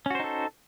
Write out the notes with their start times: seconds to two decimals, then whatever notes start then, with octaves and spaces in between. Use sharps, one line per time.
0.06 C#4
0.10 F#4
0.15 C5
0.20 D#4
0.24 A4